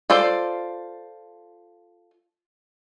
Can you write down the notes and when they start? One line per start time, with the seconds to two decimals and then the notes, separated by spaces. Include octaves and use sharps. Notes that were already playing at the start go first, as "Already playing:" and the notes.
0.10 F4 A4 C5 D5